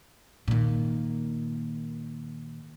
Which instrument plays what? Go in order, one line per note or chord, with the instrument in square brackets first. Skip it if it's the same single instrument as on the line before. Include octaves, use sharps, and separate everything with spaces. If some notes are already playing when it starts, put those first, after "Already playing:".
[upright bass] A#2 D#3